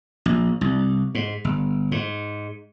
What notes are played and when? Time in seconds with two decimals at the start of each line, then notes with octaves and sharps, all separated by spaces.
0.26 A#1
0.61 C2
1.15 G#2
1.44 G1
1.92 G#2